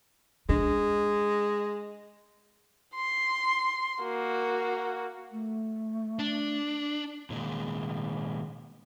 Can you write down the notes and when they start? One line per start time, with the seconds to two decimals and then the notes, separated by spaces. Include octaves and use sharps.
0.49 G#3 D4
2.95 C6
4.02 A#3 F#4
5.32 A3
6.19 D4
7.30 A#2 D#3 G#3